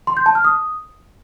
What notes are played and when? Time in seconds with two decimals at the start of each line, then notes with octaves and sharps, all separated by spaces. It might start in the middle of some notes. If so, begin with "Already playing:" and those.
0.07 C6
0.17 G6
0.26 A5
0.35 F6
0.45 D#6